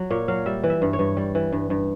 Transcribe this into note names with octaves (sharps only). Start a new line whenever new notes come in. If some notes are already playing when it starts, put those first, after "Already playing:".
Already playing: F#3
A#2 C#5
F#3 F5
G3 E5
E3
E5
G2
C#5
G2
G3
E3
G2
G2